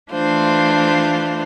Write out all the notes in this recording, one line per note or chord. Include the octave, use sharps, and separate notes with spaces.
E3 A3 D4 F4 C5